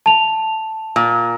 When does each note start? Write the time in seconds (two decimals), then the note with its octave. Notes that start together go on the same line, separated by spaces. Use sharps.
0.06 A5 F7
0.96 A#2